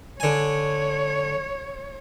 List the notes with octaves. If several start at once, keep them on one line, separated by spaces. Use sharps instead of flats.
D3 C#5 G#5